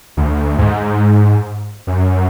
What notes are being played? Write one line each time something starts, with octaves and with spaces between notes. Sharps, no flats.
D2
G#2
F#2